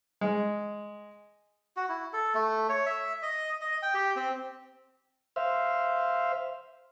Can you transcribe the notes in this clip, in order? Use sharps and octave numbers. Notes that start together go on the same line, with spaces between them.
G#3
F#4
E4
A4
A3
C#5
E5
D#5
D#5
G5
G4
C4
C5 E5 F5